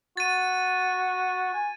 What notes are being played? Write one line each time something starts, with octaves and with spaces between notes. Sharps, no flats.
F#4 A6 D#7
G#5